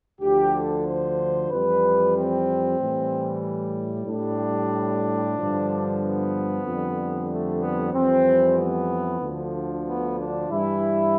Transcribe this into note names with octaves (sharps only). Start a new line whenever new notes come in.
D2 D3 F3 G4
A4
C5
F2 E3 G3 B4
C4
A2 E3 G3
A2 G3 D4
G2 D3 F3
B3
F2 D3 G3
A3
B3
F2 E3 G3 C4
B3
D2 D3 F3
B3
D4
G2 E3 G3 E4